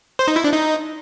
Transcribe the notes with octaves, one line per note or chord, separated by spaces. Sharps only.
C5
D#4
E4
D4
D#4